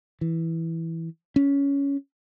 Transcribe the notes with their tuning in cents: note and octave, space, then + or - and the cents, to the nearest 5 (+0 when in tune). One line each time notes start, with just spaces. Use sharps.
E3 -5
C#4 +15